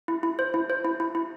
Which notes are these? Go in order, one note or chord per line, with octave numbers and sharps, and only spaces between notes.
E4
E4
C5
E4
C5
E4
E4
E4